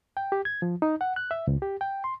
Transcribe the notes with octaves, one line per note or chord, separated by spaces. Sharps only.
G5
G4
G#6
F3
D#4
F#5
F#6
E5
C#2
G4
G5
C6